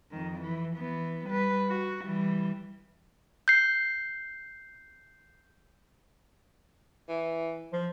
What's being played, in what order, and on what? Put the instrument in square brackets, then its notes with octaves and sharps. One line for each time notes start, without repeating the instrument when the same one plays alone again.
[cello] F2 D#3
E3
E3 B3
G3 B4
F#4
E3 G3
[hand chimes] G6 C7
[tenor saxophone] E3
[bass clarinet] F3